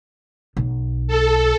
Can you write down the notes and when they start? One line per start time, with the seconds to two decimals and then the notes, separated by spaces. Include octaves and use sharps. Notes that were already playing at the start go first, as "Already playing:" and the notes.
0.57 B1
1.08 A4